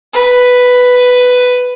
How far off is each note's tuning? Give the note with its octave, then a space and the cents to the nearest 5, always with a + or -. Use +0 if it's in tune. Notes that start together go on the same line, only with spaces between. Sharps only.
B4 +5